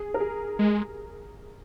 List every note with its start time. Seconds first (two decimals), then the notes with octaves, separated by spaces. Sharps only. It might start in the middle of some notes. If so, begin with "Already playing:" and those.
Already playing: G#4
0.14 A#4
0.20 G#4
0.59 G#3